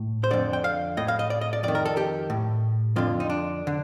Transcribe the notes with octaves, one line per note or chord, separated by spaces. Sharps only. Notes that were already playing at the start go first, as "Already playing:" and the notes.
Already playing: A2
C5
F2 D3 D5
G5
F5
A2 D#5
F5
D#5
D5
D#5
D5
F2 D#3 D5
A#4
A4
G4
A2
F2 D3 F4
D#4
D4
D3